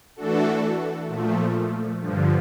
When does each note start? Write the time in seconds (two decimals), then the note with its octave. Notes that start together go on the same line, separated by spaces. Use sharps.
0.16 E3 A3 D4 F#4 A4
1.07 A#2 F3 A3
2.01 G2 D3 F3